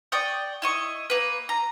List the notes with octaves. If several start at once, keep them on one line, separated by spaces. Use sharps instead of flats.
D5 G5 C#6 D#6
E4 D#5 C#6
A#3 B4
A#5